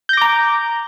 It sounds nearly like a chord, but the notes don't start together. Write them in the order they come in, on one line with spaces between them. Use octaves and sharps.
G6 A#6 D6 A#5